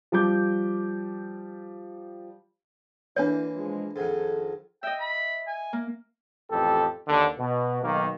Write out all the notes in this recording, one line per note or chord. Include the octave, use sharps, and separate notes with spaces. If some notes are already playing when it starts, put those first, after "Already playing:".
F3 G3 D6 G6
D3 E3 A#3 D4 E4 C#5
F3 G#3
F2 G#2 D#3 A4
D#5 E5 G5
B5
G#5
A#3
A1 F2 G4 A4
D#2 D3
B2
B1 D#3 A#3